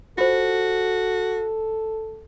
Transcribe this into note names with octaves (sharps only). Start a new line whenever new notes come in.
F4 F#4 A4 C5